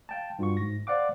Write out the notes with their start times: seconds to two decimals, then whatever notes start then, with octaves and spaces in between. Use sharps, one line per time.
0.09 F5 G5 A5
0.39 G2 F4 F#4 C#6
0.57 G#2 A#6
0.87 C5 D5 F5 F#5 D6